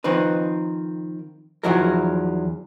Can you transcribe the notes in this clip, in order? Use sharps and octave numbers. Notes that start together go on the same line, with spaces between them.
D#3 F3 C4 D#4 B4
E2 D#3 F3 F#3 E4 A#4